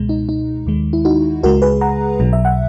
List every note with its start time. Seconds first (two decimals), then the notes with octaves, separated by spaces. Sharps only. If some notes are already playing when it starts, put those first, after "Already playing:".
Already playing: C#2 B2 G#3
0.09 D#4
0.29 D#4
0.66 D#2 D#3 G#3
0.93 E4
1.05 D#4 F#4
1.43 C#2 C#3 G#3 F#4 A#4
1.62 G#4 B4
1.81 F#5 A#5
2.20 B1 B2 F#3
2.33 E5
2.45 F#5